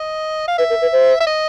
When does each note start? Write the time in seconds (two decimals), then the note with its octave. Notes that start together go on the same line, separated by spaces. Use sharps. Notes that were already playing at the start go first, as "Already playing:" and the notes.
Already playing: D#5
0.48 F5
0.58 B4 E5
0.70 A#4
0.81 B4
0.92 C5
1.20 E5
1.27 D#5